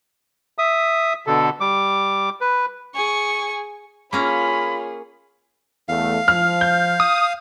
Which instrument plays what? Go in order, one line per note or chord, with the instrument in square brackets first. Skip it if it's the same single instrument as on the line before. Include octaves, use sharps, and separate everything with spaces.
[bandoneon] E5 D#6
B2 D3 A4
G3 D6
B4
[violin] G#4 C#6
[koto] A#3 C#4 A#5 [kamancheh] F4 C#5 [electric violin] G#4 [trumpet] B5
[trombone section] E2 A3 [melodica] F5
[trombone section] F3 [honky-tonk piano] F6
[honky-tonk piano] G6
[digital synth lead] D#6